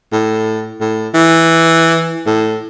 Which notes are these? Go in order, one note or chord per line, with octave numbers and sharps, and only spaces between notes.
A2
A2
E3
A2